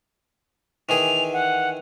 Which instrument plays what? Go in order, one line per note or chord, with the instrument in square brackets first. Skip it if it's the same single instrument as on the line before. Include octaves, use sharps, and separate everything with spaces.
[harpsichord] D#3 E3 G#4 [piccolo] F7
[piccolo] F#5